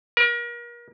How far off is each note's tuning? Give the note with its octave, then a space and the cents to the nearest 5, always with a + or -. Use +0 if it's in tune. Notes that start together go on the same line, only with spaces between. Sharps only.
A#4 +35